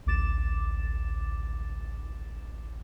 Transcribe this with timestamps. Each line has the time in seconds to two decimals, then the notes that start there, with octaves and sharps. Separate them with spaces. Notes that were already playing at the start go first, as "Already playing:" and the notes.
0.06 A1 D2 D6 A6 E7